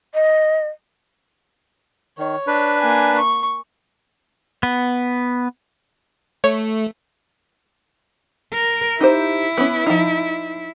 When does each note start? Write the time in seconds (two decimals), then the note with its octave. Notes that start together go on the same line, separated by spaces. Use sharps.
0.14 D#5
2.18 D#3 C#5
2.47 D4 B4
2.79 A#3 G#5
3.18 C#6
4.63 B3
6.44 A3 C#5
8.54 A#4
9.01 D#4 E4 G4 C5
9.58 B3 C#4
9.86 F3 D#4